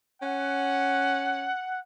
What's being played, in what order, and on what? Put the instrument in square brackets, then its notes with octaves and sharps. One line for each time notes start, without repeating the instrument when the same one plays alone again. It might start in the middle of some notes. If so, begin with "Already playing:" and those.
[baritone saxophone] C#4 [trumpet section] F#5